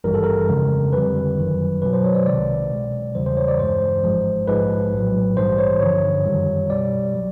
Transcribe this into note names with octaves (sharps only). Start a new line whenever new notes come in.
G#1 G2 E3 G3 A#4
A4
A#4
F2 C#3 F3 G#3
F2 D3 G3 B4
G#1 F#2 D#3 F#3
B1 B2 F#3 B4
C5
C#5
D5
C2 C3 D#3 G#3 D5
B1 B2 G#3
E2 C#3 E3 G3 C5
C5
C#5
D5
G2 E3 G#3 C5
G#1 G#2 F3 G#3
A#1 G#2 F3 G#3 B4
A#1 A2 F#3
A#1 G#2 E3 G3 C5
C#5
G2 D3 F3 C#5
F#2 D#3 G3
B1 B2 G3 D5
F#3